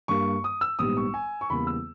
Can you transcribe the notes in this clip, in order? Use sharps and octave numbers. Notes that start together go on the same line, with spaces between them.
G2 G3 A#3 C#6
D#6
E6
A#1 G#2 G3 B3 D#6
C#6
G#5
C#6
E2 C#3 G3 A#3 B5
E6